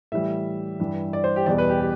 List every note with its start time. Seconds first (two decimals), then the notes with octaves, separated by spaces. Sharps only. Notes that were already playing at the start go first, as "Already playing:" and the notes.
0.12 A2 E3 G3 E5
0.80 G2 E3 G3
1.13 D5
1.24 C5
1.36 G4
1.46 E2 B2 G3 D5
1.58 B4
1.69 G4
1.80 G4